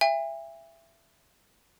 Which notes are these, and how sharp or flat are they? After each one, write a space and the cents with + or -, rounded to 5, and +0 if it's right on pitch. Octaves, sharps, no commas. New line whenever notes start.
E5 +20 G#5 -45